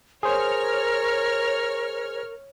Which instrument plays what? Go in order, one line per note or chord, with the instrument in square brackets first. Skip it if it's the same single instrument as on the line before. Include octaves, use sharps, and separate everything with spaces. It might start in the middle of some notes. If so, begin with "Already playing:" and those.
[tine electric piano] G#4 C5 [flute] A#4 [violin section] C#5 F6